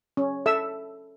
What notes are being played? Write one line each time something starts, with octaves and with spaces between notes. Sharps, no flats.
C#4
A4 E5 E6